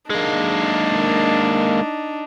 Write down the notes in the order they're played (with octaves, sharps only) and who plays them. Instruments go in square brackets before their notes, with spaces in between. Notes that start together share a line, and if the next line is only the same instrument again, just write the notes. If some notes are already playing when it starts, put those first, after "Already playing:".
[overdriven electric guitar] G#3 A#3 [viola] D4 D#4